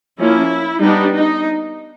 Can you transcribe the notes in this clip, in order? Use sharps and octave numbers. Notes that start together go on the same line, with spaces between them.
F3 A#3 C#4 E4
G3 B3 D4 D#4
D#4